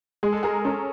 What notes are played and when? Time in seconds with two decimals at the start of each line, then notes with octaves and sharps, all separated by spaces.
0.23 G#3 G#4
0.33 A4
0.43 G#4 A#4
0.65 C#4 A4